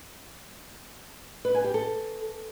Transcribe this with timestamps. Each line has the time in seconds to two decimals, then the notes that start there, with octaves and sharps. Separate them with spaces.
1.45 B4
1.55 G#5
1.64 G4
1.74 A4